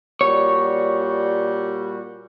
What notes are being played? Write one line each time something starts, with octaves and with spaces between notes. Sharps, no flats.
A#2 G3 F#4 C#5